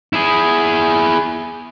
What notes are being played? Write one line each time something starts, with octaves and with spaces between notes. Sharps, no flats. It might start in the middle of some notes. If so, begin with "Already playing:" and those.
E4 G#4